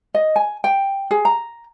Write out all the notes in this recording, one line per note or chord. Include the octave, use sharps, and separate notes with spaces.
D#5
G#5
G5
G#4
A#5